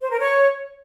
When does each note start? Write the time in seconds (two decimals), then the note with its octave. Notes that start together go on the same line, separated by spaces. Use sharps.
0.01 C5
0.10 A#4
0.19 C#5